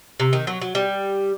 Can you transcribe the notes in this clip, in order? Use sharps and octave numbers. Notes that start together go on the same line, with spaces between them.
C3
D#3
F#3
F#3
G3